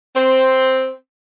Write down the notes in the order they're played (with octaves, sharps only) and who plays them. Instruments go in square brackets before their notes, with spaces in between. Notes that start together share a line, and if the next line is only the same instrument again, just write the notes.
[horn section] C4